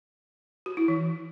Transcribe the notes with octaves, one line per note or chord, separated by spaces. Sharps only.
F#4
E4
E3